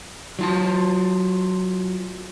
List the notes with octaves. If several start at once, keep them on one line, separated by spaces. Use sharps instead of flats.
F#3 F4 A5